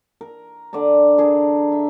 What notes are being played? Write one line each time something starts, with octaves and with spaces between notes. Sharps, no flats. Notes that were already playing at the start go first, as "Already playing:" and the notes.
A#4
D3 D5 D#5 A#5
D4 G#4 A#4
E5